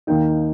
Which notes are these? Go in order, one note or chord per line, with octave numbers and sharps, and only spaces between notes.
D#2 D#3 A#3 D#4 G5